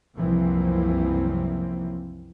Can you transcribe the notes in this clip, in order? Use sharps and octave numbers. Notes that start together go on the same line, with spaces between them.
C2 F#2 E3 F3 A#3 C4